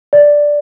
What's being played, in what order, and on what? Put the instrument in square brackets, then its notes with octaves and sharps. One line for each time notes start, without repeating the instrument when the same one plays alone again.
[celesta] D5